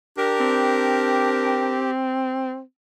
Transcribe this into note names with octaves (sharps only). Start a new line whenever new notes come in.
D4 G4 A#4
C4